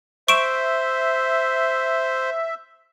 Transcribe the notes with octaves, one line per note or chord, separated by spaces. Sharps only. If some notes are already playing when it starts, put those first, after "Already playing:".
C5 E5 C#6 D7 E7